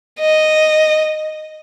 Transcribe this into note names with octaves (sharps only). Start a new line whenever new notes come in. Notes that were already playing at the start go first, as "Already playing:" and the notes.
D#5